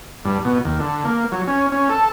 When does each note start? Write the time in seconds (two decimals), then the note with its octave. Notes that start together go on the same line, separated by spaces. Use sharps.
0.25 G2
0.45 B2
0.65 D#2
0.80 D3
1.05 A#3
1.32 F#3
1.47 C#4
1.72 C#4
1.89 A4